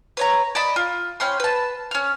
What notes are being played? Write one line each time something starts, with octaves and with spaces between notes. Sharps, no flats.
B4 C#5 A#5
D5 D#5 A5 B5
F4
C#4 G5 B5 C6
B4 A5
C#4 F6